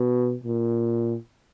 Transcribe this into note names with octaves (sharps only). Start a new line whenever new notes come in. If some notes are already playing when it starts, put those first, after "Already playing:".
Already playing: B2
A#2